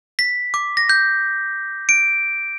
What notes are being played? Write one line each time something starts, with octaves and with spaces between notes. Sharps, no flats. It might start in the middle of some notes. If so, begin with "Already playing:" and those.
B6
D6
A#6
G6
D7